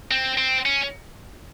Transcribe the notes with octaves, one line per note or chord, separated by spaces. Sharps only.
C4
C4
C#4